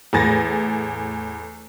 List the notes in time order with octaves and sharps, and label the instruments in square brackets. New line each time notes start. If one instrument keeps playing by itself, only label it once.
[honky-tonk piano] E2 A2 G#5 A6 A#6